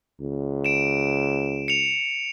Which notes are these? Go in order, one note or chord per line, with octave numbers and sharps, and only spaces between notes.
C#2
D7 E7
C#7 F7